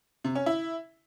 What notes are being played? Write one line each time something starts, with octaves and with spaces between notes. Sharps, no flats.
C3
C#4
E4